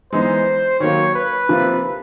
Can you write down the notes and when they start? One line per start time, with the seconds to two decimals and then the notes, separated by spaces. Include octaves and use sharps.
0.12 E3 G#3 B3 D#4 C5
0.80 D#3 F#3 A#3 C#5
1.15 B4
1.49 C3 F3 A#3